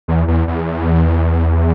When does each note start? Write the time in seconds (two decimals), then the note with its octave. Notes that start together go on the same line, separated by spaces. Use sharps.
0.08 E2
0.28 E2
0.48 E2